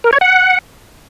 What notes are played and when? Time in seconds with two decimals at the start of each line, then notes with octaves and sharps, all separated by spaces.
0.04 A#4
0.13 C#5
0.21 F#5